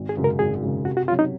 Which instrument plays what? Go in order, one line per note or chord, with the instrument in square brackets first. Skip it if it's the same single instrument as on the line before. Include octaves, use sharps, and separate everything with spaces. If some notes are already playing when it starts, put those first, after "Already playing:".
Already playing: [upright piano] G#1
[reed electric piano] G#4
[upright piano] F#2 C#3 G#3
[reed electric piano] A#4
[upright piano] G#1 [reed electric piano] G#4
[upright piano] F#2 C#3 G#3
[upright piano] C3 [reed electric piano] F#4
[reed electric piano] F#4
[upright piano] F#3 C#4 [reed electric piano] F4
[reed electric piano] D#4